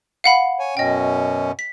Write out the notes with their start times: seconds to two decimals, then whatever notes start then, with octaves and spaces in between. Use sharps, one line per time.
0.24 F5 F#5 B5
0.59 C#5 G#5
0.77 F#2 B2 C#4 D#5 G5
1.59 B6